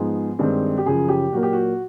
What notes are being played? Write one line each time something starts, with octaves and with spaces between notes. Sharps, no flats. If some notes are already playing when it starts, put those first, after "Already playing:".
Already playing: G#2 F3 G#3 B3 G#4
G2 D#3 G#3 C4
G4
F#2 C#3 F3 G#4
G4
A#2 F#3 A#3 F#4
G4
F#4